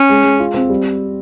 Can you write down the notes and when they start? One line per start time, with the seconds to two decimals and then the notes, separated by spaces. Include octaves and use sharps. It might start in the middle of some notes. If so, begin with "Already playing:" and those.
Already playing: C#4
0.09 G#3
0.24 G#3
0.40 F4
0.54 C4
0.70 G3